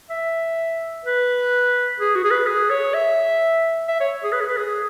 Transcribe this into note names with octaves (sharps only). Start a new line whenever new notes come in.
E5
B4
G#4
F#4
G#4
B4
G#4
C#5
E5
E5
C#5
G#4
B4
G#4
B4
G#4